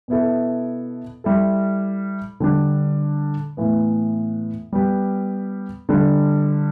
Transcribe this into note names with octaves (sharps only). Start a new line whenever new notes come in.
B2 B3 E4 A4
G3 E4 A4
D3 G3 D4
A2 E3 B3
G3 B3 G4
D3 G3 D4 A4